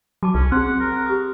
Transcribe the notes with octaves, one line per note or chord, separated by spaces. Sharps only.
F#3 F#4 A5 D6
C2 C#4
C4 G#4 F#5 C6
A#4
G4 D#6